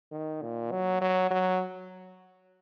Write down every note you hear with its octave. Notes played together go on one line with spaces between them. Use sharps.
D#3
A#2
F#3
F#3
F#3